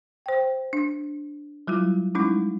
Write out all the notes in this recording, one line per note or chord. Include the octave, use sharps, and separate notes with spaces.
C5 G5
D4
F#3 G3 E4 F4
G3 G#3 C#4 D#4 E4